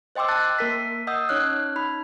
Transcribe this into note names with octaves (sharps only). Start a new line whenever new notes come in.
C5 D#5 G5 C6 D6 E6
A5 F#6 A6
A#3 A#4 B6
D#5 F#5 D#6 E6 G6
C#4 D#4 C#5 F6 F#6
D#4 B5